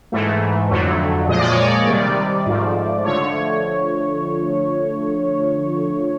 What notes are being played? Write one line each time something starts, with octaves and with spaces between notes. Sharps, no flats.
G#2 E3 A3
F2 D3 F#3 A3
A#2 F3 G#3 D#5
D5
C#5
D5
C3 D#3 G3
G#2 F3 A3
D3 F3 A3 C#5